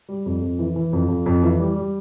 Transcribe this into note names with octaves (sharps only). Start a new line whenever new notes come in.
G3
F2
F2
E3
E3
F2
F2
F2
E3
G3
G3